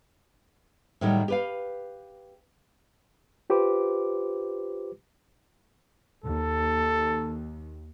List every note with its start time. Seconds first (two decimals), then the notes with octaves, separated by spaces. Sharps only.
1.01 A2 D#3 F#3 G3
1.28 G4 B4 F5
3.50 F4 G4 B4 C5 D6
6.24 D#2 A4